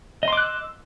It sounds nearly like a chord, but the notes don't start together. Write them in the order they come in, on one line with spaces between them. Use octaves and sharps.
D#5 C6 D6 F#6 E6